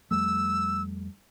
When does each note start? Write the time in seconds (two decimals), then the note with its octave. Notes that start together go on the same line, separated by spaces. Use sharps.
0.11 F2 G3 A3 E6